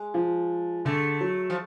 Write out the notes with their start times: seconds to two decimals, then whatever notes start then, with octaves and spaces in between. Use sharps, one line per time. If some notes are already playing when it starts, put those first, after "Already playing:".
Already playing: G#3
0.14 F3
0.85 D3 A3
1.21 F#3
1.50 F3